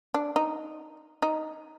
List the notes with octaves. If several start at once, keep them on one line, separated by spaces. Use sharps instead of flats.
D4
D#4
D#4